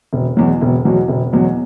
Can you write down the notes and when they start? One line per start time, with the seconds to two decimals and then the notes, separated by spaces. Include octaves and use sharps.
0.13 E1
0.37 E2 B2 F#3
0.61 E1
0.85 E2 B2 F#3
1.08 E1
1.33 E2 B2 F#3